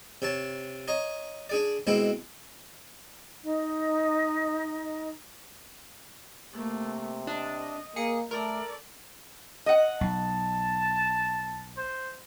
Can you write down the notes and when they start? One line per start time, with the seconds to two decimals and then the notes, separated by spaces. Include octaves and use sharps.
0.22 C3 C#5 A5
0.88 C#5 D#5 A#5
1.50 D4 G#4 D5
1.87 B2 G#3 C4 E4
3.43 D#4 D#5
6.53 C3 A3 A#3
7.27 D4 D#5
7.96 A#3 G#4 C#7
8.31 A3 A4 A#4 D5
9.66 D#5 F#5
10.01 B1 A5
11.77 C5